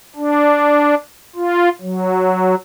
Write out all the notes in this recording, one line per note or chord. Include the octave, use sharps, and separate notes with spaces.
D4
F4
F#3